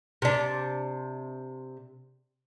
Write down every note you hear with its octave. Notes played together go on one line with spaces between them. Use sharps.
C3 D4